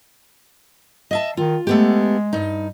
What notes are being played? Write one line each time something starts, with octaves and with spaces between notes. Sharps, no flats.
D#5 E5 A5
D#3 F4
G#3 A3 B3 G4
G2 D#4